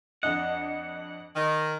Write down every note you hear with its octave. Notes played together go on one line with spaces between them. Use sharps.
F2 D4 D#5 F#5
D#3